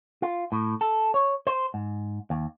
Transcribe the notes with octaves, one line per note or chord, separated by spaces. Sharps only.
F4
A2
A4
C#5
C5
G#2
D#2